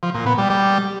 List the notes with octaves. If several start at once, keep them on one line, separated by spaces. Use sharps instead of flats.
F3
A#2
B3
G3
G3